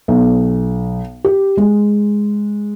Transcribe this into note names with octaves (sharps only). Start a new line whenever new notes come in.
B1
G4
G#3